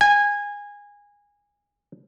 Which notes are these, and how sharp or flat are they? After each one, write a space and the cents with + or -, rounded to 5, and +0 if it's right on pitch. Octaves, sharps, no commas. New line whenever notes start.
G#5 -20